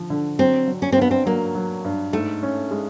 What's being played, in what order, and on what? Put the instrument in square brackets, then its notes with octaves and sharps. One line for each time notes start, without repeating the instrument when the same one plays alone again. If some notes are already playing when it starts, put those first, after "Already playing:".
Already playing: [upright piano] D3 F3
D3
[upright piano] F#3 [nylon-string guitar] C4
[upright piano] F#3
[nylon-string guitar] C#4
C4
[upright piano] G2 [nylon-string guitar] B3
[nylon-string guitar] C4
[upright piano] F#3 [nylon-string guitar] A#3
[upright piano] F#3
G2
[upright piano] G#2 [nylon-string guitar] A3
[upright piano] C#4
G#3